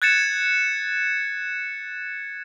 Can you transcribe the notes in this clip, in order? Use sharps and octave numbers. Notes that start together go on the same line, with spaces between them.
F#6 G#6 A6 C#7 E7